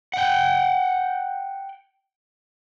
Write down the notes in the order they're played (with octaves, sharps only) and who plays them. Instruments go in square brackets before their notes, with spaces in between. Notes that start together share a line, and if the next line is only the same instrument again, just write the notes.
[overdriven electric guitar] F#5 G5